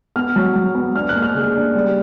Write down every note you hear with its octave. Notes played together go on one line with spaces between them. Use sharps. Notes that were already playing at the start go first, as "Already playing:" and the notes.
B3 F6
F#3
F#3
B3
D4 F6
F#6
A#3
F6
C#3
D4
G3